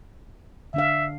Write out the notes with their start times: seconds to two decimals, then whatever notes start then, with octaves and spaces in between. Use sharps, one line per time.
0.74 D3 D4 E5 F5